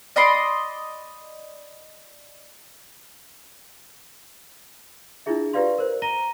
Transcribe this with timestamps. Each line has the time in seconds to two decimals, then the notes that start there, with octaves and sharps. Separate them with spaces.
0.16 D5 D#5 B5 C6
5.26 D4 E4 F4 G#4 E5
5.53 F4 G4 B4 D5 F5 C6
5.78 A#4 C5
6.02 A#5 A#6 D#7 G7